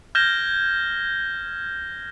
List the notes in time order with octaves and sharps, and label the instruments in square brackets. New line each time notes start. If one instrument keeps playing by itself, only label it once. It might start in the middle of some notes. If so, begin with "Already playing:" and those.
[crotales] F6 G6 G#6 A#6 E7 G7